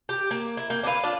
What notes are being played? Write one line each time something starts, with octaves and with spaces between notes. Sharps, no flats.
G4
A#3
E4
A#3 G5
D4 E4 B4 F5
D4 F4